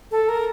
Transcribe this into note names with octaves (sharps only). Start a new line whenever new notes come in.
A4
A#4